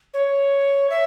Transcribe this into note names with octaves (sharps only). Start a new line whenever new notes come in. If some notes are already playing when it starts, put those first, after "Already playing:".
C#5
E5